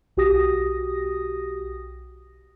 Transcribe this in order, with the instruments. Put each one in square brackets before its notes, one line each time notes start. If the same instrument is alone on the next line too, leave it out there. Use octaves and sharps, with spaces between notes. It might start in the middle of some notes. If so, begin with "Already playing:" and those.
[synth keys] B1 F#4 G4 D#6 A#6